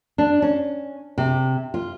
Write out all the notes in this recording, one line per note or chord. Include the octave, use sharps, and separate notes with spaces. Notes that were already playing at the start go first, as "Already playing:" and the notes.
D4
C#4
C3
F4